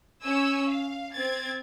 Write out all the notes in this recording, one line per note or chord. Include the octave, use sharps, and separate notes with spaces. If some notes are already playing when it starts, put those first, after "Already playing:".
C#4 C#5 G#5 E6
F5
C4 G#6 A6